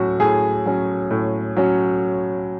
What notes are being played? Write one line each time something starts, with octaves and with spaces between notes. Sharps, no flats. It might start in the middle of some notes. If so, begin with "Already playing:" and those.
Already playing: A2 F#3 C#4 F#4
A2 G#4
F#3 C#4
A2
F#3 C#4